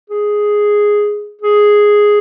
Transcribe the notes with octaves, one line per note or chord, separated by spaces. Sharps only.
G#4
G#4